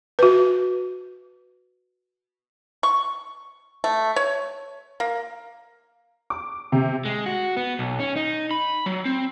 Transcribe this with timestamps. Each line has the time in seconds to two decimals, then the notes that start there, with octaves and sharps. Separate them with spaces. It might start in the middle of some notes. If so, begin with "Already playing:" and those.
0.19 F#4 B4
2.83 C#6
3.84 A3
4.16 C#5
5.00 A#3
6.30 D6
6.72 C3
7.05 G#3
7.26 F#4
7.57 B3
7.79 B1
8.00 C#4
8.16 D#4
8.51 B5
8.86 F#3
9.05 C4